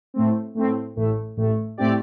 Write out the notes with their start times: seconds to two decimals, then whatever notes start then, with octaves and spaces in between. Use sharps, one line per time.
0.14 A2 A3 C4
0.55 A2 A3 C4
0.96 A1 A2 A3
1.37 A1 A2 A3
1.78 A2 A3 C4 G4 D5